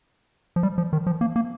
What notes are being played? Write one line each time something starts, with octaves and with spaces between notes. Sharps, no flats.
F3
G3
F3
D#3
F3
A#3
A#3